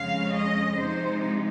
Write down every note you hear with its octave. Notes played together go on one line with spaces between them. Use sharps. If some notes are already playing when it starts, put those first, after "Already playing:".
Already playing: F2 C#3 G#3 C#4 F5
D#5
C3 F3 G#3 D#4 C5